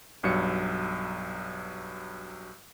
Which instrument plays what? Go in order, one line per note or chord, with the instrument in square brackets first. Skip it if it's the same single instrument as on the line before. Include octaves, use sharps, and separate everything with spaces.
[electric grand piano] B1 G2 F#3 C#7